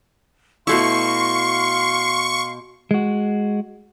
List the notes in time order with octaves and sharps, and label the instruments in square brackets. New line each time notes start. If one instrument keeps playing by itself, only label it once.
[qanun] B2 A3 E4 [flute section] F5 C6 [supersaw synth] C#6
[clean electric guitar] G#3 F#4